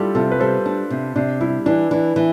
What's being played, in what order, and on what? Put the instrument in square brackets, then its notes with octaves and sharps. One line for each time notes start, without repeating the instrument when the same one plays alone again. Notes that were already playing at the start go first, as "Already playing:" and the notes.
Already playing: [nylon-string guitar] G3 [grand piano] D4 E4 F4 G4 A4
[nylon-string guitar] C3 [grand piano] F4 A4
[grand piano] B4
[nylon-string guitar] G3 [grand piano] A4 C5
[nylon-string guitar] D4
C3
[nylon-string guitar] C3 [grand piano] D4
[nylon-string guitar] G3 [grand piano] E4
[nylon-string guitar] E3 [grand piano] D4
[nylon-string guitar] E3 [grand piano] D4
[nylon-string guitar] E3